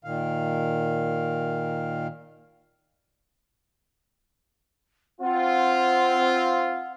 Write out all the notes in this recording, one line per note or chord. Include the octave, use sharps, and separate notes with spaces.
A#2 D#3 F5
C4 F4 F#5